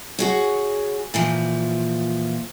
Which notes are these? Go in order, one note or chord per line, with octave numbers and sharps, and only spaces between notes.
F#4 G#4 C#5
A#2 E3 F3